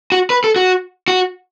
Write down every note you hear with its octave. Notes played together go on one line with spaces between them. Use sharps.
F#4
B4
A4
F#4
F#4